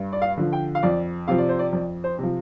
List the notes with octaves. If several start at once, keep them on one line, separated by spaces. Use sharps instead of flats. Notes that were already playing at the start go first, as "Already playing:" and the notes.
Already playing: G2
D5
F5
D3 F3
G5
F5
F2 D5
C3 F3 F5
D5
C5
D5
F2 D5
C5
C3 F3